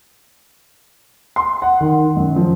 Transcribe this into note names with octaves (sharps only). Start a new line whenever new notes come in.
C6
F#5
D#3
F#2
F3